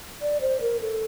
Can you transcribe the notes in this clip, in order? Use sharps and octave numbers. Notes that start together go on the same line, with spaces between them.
D5
C5
A#4
A4